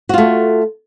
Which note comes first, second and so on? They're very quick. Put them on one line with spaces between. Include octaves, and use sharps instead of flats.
F#4 F4 A3